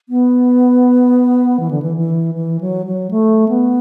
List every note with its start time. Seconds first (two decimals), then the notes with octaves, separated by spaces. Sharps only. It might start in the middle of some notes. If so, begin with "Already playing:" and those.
0.09 B3
1.60 E3
1.71 D3
1.82 E3
1.97 E3
2.35 E3
2.61 F#3
2.86 F#3
3.11 A3
3.48 B3